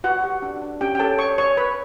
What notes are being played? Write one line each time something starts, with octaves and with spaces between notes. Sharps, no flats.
F#4 B4 F#5
G4
D4
D4
C#4 G4 G5
G5
A4 C#5 A5
C#5 C#6
C#5 C#6
B4 C#5 B5